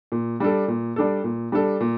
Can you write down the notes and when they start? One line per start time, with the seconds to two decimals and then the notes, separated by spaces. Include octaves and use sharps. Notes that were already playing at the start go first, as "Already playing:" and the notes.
0.12 A#2
0.40 G3 D4 A4
0.68 A#2
0.96 G3 D4 A4
1.24 A#2
1.52 G3 D4 A4
1.80 A#2